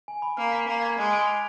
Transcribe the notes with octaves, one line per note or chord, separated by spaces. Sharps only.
G#5
B5
A#3 F6
B6
A#3 D#7
G#6
G#3 D6
D7
F7